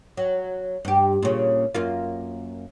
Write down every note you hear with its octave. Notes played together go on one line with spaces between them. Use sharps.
F#3
G2 G4
A#2 C#3
F#2 A#3 F4